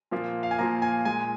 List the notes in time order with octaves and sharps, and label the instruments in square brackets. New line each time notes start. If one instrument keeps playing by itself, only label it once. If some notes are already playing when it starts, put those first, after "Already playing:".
[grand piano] A#2 F3 A#3
F5
G#5
A#2 F3 A#3 A#5
G#5
A#2 G#3 G#5